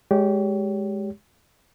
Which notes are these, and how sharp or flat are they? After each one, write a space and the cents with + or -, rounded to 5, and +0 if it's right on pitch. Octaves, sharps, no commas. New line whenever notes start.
G#3 +0 G4 -15 C#5 +30